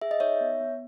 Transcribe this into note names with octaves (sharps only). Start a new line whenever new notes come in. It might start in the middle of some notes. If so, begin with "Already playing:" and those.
G#4 E5
D#5
D#4 C#5 E5
B3
B3